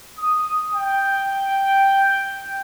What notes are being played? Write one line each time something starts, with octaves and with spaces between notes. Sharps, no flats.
D#6
G5